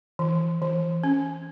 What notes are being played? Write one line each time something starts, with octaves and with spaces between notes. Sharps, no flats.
E3
E3
C#4